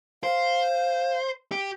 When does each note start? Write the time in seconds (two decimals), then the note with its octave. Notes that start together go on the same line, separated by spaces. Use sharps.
0.24 C5 F5
1.52 G4